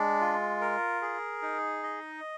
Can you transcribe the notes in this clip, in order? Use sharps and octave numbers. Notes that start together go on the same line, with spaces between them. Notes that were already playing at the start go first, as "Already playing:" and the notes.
Already playing: G#3 D4
F4
A#4
G#4
D#4
D#5